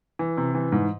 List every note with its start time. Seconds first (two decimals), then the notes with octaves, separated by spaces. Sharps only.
0.19 E3
0.37 C3
0.55 E3
0.72 G#2